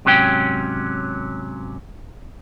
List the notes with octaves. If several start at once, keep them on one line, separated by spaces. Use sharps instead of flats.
G#2 C3 F#3 C#4 G5